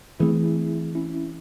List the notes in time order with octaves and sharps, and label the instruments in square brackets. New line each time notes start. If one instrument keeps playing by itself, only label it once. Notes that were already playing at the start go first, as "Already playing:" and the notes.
[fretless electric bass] E3 A3 C4 [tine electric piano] E4 G#4
[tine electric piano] C#4 E4